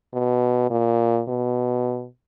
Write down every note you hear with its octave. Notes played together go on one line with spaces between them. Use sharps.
B2
A#2
B2